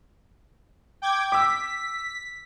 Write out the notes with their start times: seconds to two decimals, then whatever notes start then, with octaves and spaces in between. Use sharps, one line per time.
1.02 G5 D6 G#6
1.32 D6 E6 B6